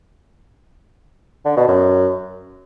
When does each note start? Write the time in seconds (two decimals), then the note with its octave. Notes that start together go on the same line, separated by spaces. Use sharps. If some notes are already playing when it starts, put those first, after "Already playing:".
1.45 D3
1.56 B2
1.68 F#2